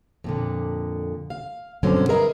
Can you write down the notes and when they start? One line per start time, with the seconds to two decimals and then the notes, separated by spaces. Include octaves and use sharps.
0.24 F2 A#2 D3
1.30 F5
1.83 G2 B2 D3 F#3 C4 C#4
2.09 G#4 A#4 B4 D#5 E5 A#5